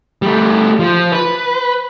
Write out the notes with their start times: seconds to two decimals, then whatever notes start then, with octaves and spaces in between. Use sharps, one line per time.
0.22 G3 A3
0.79 F3
1.12 B4